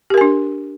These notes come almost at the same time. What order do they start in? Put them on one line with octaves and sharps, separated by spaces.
G4 A#4 G#5 D4